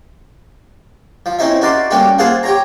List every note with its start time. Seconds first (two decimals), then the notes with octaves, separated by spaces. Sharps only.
1.26 F3
1.39 C4 C#4 D#4 E4 E5
1.61 D#4 F#4 A#4 D5 A5 C6
1.91 G3 A3 A#3 C#4 F#4 G4
2.18 A#3 F4 G#4 C5 F#5 A5
2.43 G4 C#5 A#5